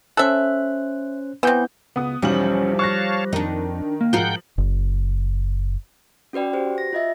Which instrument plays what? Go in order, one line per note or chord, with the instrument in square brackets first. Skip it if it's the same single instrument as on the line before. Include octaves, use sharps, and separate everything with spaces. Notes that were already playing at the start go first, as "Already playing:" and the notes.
[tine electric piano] C#4 C5 F#6 [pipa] A4 E5
[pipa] E3 C4 [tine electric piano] B3 E4 G6
[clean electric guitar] C#2 [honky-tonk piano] B3 D#6
[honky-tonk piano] B1 E2 F#7 [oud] F3 [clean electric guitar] G3 [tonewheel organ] C#4
[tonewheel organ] C#5 F5 A5 [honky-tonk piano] C#6 F#6 A#6
[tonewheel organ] F2 [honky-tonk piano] D#3 [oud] D4 D#4
[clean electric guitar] A#3
[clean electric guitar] G#2 [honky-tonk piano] F3 F#7 [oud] F4 A#4 [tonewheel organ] F#5 G5 G6
[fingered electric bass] F#1
[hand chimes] C#4 F#4 B4 D5 G5
F#4 G4 C5
A#6
F4 D#5 E5